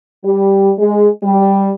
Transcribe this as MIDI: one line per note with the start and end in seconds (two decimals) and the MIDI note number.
0.25 0.72 55
0.78 1.07 56
1.23 1.71 55